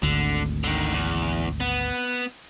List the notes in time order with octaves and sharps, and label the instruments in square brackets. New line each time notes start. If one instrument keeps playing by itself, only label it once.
[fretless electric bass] G#1 D2 [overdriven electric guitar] D3
[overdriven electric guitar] D3 D#3
E2
B3